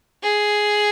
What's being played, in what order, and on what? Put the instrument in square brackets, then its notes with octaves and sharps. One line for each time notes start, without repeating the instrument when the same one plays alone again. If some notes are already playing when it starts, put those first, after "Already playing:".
[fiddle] G#4